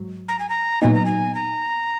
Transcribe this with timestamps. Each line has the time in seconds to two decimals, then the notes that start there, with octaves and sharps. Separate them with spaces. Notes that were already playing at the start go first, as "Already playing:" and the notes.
Already playing: G#2 F#3
0.28 A#5
0.39 G#5
0.49 A#5
0.82 A#2 F#3 B3 D#4 G#5
0.94 A#5
1.06 G#5
1.35 A#5